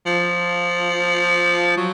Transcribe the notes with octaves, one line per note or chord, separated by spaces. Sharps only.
F3
F#3